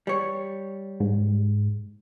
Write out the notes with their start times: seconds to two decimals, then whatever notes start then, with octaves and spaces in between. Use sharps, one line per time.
0.07 G3 C#5
1.00 G#2